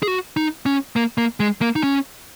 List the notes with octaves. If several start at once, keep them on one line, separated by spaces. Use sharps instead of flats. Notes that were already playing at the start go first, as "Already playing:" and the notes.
G#4
F#4
D#4
C#4
A#3
A#3
G#3
A#3
D#4
C#4